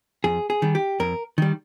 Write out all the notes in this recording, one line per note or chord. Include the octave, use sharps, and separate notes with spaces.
F2 G#4
G#4
D#3 G3
G4
F2 A#4
D#3 G3